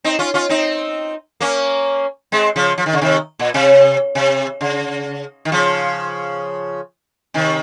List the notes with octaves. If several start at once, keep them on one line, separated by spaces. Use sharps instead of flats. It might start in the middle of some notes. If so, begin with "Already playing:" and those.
C4 D#4
C#4 F4
C#4 F4
C4 D#4
A#3 C#4
G#3 C4
C#3 F3
F3
D#3
C#3
C3 D#3
A#2
C3
C3
C#3
D#3
C#3 F3
C3 D#3